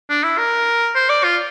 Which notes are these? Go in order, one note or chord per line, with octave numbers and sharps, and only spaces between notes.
D4
E4
A#4
C5
D5
F4